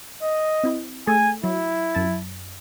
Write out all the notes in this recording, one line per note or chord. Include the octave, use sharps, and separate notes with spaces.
D#5
C4 E4
A3 G#4 A4 G#5
F#3 E4
F#2 A5 A6